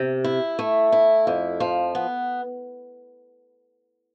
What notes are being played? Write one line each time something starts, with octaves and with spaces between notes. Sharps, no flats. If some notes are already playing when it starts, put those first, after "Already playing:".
Already playing: C3
E4
A3
E4
F2
F3
B3